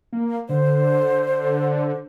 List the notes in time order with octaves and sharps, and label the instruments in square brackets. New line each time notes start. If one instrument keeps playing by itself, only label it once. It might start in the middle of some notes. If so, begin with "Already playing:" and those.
[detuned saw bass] A#3
[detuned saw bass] D3 [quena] C5